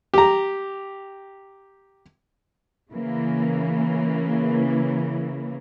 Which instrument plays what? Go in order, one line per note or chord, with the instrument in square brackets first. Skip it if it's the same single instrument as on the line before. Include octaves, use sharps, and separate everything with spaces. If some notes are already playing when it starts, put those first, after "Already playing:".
[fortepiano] G4 A#5
[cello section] C#3 E3 A#3